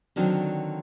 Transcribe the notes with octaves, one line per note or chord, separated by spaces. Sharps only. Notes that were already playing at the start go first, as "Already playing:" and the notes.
D3 D#3 F#3 C4 D4